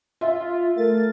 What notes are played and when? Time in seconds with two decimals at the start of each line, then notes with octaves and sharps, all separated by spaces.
0.21 F4 E5
0.77 A3 A#4 A6